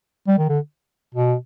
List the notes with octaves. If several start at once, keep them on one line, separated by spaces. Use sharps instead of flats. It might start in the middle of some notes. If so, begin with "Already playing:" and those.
G3
D#3
D3
B2